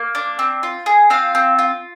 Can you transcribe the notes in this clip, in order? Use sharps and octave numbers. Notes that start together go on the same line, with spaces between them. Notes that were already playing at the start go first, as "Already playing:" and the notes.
Already playing: A#3
D4
C4
F4
G#4
C4 F4 F5
C4
F4